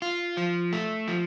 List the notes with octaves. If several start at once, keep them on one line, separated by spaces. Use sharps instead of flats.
F4
F3
A3
F3